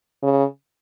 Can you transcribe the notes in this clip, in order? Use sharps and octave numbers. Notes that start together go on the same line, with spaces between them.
C#3